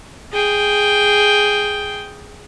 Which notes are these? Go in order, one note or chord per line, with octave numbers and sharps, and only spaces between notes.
G#4 G5